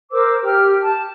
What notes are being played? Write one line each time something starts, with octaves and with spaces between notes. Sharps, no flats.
A#4 C5 D6 E6
G4 F6
A5